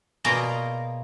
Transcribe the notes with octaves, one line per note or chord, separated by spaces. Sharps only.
B2 A#3 F4 G#4 D5 A#5